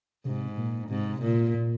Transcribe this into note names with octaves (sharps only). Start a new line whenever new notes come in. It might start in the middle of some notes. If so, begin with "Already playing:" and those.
G#2 C3
A#2
G#2 C3
A#2
A#2